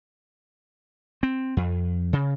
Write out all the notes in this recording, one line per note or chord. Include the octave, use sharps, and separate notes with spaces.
C4
F2
C#3